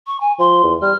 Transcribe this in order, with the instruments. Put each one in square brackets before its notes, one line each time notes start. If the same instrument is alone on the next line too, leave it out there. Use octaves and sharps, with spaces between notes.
[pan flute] C#6
G#5
[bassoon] F3 [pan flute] C6
[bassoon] E2
[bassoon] G3 [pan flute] F6